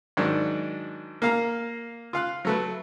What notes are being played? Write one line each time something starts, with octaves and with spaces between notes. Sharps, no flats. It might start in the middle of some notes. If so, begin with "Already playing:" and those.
G#2 D#3 F#3 D4
A#3 F5 A#5
F4 F5 F#6
F#3 A3 B4